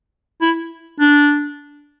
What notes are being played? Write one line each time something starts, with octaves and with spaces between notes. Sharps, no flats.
E4
D4